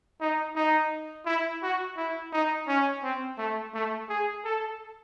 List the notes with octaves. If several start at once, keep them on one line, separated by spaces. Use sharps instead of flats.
D#4
D#4
E4
F#4
E4
D#4
C#4
C4
A3
A3
G#4
A4